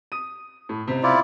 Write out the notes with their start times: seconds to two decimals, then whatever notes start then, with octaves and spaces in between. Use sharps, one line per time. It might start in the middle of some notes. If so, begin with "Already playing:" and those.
0.12 D#6 D#7
0.69 A2
0.87 C#2 C3 C4
1.03 E4 F4 D5